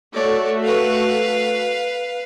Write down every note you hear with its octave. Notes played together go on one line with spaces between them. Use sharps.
A3 F#4 C#5 D5
B4 F5